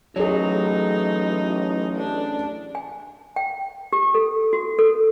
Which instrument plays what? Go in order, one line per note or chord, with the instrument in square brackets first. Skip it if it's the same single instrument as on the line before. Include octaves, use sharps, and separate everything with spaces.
[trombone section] A1 [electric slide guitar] F#3 [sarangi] D#4 [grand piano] G#4 C#5
[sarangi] D4
[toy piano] G#5
G5
G4
A4
F#4
A4